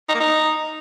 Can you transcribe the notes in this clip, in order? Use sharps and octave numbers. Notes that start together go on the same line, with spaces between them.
D#4
A#3
D#4